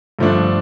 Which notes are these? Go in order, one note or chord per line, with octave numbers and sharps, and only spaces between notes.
G2 D3 F3 A3 D4